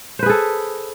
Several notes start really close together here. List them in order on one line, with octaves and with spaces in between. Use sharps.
C5 B4 G#4 A4